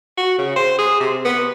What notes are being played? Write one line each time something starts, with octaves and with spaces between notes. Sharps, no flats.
F#4
C#3
C5
G#4
C3
B3